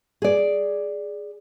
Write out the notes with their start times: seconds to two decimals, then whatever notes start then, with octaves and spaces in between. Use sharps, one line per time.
0.22 G#4 D5